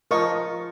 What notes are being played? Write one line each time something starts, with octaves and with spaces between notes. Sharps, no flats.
F3 A#4 D#5 C#6